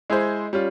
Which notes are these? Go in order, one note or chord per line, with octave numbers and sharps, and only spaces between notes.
G#3 E4 G#4 C5
G3 C#4 F4